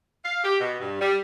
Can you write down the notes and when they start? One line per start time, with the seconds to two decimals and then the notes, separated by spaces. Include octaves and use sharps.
0.25 F5
0.44 G4
0.60 B2
0.80 G2
1.01 G3